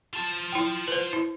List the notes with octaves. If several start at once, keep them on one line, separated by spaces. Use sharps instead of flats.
F4 A5
E4 G5
B4 C5
E4